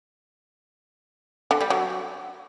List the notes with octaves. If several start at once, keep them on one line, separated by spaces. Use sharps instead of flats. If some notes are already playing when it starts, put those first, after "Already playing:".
D3
G3
F#3